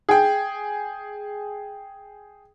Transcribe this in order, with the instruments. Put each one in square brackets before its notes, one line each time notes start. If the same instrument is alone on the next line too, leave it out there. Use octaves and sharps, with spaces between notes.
[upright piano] G#4 G5